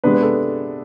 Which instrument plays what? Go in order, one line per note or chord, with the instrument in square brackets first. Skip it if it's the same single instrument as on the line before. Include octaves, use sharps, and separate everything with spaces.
[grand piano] C3 G#3 B3 D4 B4
B4
A4